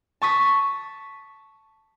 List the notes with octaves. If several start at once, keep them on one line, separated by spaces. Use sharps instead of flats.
A5 C#6 D#6 B6